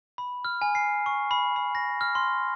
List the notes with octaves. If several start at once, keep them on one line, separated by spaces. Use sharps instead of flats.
B5
F6
G#5
C7
C#6
B5
B5
A#6
F6
C6